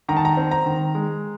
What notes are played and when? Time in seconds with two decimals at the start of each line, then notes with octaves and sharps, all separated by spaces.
0.09 D#3 A#5
0.17 A5
0.25 A#5
0.37 C4
0.51 A#5
0.66 D#3
0.95 G#3